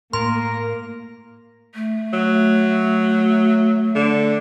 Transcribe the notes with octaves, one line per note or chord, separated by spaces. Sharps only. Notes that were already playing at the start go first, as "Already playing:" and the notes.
A2 A#3 A#4 C6
A3
F#3
D3